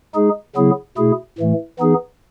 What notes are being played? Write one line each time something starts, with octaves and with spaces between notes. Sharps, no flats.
G#3 D#4 G#4
C#3 F#3 B3 E4 G#4
B2 A3 E4 G#4
A2 E3 A3
E3 B3 D#4 G#4